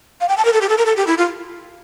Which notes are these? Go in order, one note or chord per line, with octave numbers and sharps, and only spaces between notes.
F5
G5
A5
A#4
A4
G4
A4
A#4
A4
G4
E4
F4